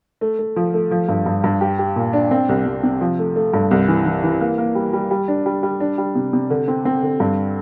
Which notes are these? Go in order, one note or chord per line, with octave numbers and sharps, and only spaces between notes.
A3
A3
F3
A3
F3
G2
G2
G2
G4
G4
A#2
D4
C4
C2
C2
C3
F3
A3
A3
G2
C2
E3
E3
E3
A#3
A#3
G3
G3
G3
D4
G3
G3
D4
G3
C3
C3
D3
C4
C4
D3
G2